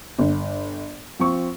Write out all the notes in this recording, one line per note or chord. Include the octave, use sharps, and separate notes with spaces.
G1
F3 C4 C#6